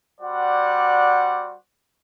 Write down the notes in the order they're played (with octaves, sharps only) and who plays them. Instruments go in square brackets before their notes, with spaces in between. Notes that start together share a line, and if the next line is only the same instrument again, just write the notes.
[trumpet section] G3 F#4 C5 D5 F#5